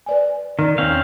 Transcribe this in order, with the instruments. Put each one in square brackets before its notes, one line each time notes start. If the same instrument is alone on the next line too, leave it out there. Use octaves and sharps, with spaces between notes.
[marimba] B4 D5 G#5
[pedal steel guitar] D#3 [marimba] D5 F6
[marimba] E2 D#3 [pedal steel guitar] C4 C#4 F5